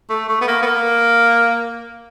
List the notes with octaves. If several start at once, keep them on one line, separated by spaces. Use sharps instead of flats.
A3
A3
B3
A#3
B3
A#3